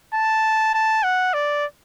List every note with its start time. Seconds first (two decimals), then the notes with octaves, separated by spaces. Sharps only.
0.14 A5
0.74 A5
1.04 F#5
1.34 D5